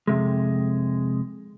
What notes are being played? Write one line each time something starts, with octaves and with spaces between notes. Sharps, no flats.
F2 C3 G#3